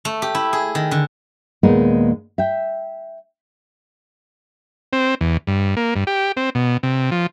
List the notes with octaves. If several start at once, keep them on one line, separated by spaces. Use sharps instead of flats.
A3
G4
E4
G#4
D#3
D3
D#2 A#2 G#3 B3 D#4 A#4
E5 G5
C4
E2
G2
A#3
G2
G4
C4
B2
C3
F3